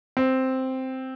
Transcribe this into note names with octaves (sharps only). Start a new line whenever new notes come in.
C4